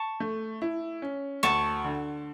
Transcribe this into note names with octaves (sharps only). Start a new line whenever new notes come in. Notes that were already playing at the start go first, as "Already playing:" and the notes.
Already playing: A5 C#6
A3
E4
C#4
D2 A5 C#6
D3